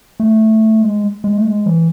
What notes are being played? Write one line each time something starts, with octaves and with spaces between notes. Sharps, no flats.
A3
G#3
G#3
A3
G#3
E3